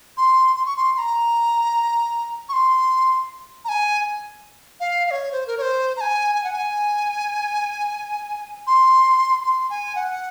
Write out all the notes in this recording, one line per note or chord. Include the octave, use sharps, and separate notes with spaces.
C6
C6
C#6
C6
C6
A#5
C#6
C6
A#5
G#5
F5
F5
C#5
C5
A#4
C#5
C5
A#5
G#5
G#5
F#5
G#5
C6
C6
G#5
F#5